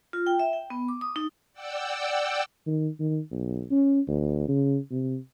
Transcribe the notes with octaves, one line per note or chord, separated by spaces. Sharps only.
F4
G5
E5
G5
B3
D6
D#6
D#4
D5 F#5 G5 E6
D#3
D#3
B1
C#4
D2
C#3
C3